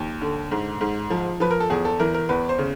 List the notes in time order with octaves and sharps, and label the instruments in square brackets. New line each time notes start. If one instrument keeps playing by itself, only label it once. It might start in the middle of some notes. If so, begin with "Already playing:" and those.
Already playing: [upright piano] D#2
D3
G#2
G#2
F3
F3 B4
A#4
A4
E2 G#4
A4
E3 A#4
A#4
E2 B4
C5
C#3